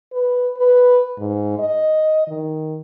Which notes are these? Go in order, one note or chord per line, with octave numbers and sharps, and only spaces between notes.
B4
B4
G#2
D#5
D#3